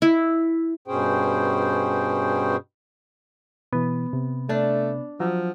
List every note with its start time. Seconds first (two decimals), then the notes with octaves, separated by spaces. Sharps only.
0.02 E4
0.88 G2 B2 C#4 G#4 C5 G5
3.73 B2 E3 B3
4.13 C3
4.49 A3 D4
5.20 F3 F#3